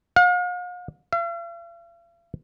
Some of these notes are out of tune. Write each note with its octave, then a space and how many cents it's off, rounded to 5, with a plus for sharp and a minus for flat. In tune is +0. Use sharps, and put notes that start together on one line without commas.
F5 +45
F5 -45